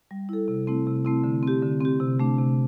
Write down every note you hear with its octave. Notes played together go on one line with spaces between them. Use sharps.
G3
E4 A4
C3
A3 C4 E4
C3
A3 C4 E4
D3
C4 G4
D3
C4 G4
C3
A3 D4
C3